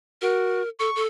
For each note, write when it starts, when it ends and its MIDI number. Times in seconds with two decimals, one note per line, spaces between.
0.22 0.62 66
0.22 0.69 70
0.79 0.90 69
0.79 1.02 85
0.96 1.07 69